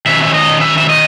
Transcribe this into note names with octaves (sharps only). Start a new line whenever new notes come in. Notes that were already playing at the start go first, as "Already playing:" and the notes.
D#3 F#3 C#4 E5
E5
D#5
E5
E5
D#5